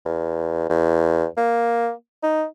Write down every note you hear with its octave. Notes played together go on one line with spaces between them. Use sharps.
E2
E2
A#3
D#4